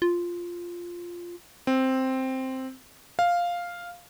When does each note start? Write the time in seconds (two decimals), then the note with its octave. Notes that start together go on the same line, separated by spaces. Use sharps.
0.02 F4
1.67 C4
3.19 F5